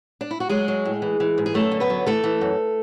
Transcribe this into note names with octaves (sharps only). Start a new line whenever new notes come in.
D4
E4
F#4
F#3 G#3 G#4
F#3
A2
E3
E3
G#2
G#4
F#2 A3 A4
D3
B3 B4
F#3
E3 A3 A4
E3
F#2